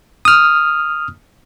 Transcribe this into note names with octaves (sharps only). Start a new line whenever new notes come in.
D#6 F6